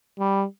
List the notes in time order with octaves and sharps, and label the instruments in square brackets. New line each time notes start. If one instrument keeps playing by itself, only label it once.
[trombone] G3